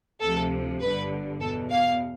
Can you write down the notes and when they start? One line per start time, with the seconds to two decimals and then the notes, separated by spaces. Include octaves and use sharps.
0.21 D2 C3 F3 A4
0.82 G1 G2 D3 B4
1.41 E2 B2 A4
1.72 F5